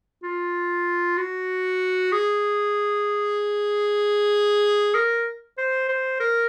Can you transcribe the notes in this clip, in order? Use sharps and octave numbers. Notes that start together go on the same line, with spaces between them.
F4
F#4
G#4
A#4
C5
C5
A#4